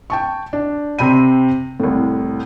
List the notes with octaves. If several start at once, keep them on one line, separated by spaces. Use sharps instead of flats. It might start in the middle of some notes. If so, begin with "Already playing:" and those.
G5 A5 C#6
D4
C3 C4 B5 D#7
C2 A2